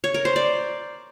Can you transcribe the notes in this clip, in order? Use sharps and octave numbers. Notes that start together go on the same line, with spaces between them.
C#5
A#4
C5
D5